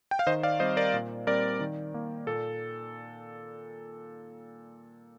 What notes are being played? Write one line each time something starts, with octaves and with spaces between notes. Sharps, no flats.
G5
F5
D#3 C5 D#5
D5 F5
G3 C4 C5 D#5
A#4 D5
A#2
G3 C4 A#4 D5
D#3
A#3
A#2 A4